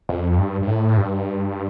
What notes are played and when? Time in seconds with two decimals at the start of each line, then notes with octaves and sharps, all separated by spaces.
0.09 F2
0.38 G2
0.62 G2
0.67 A2
0.97 G2